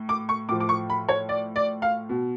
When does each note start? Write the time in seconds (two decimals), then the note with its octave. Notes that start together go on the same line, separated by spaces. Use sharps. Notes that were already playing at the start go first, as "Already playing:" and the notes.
Already playing: A2
0.09 D6
0.29 C#6
0.49 A2 F3 D6
0.60 D6
0.69 C#6
0.90 B5
1.09 C#5
1.29 D5
1.56 D5
1.82 F5
2.09 B2